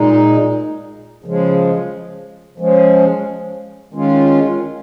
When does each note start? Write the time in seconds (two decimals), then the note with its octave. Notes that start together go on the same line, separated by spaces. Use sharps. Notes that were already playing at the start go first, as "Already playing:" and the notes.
Already playing: A#2 G#3 D#4
1.24 C#3 F3 G#3
2.58 F3 G#3 C#4
3.93 D#3 G#3 C#4 F4